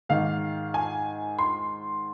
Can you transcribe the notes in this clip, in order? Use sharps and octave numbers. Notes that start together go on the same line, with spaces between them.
G#2 D#3 F5
G#5
C6